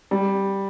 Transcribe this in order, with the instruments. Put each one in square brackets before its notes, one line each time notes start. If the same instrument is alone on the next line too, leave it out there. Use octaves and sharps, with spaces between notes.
[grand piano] G3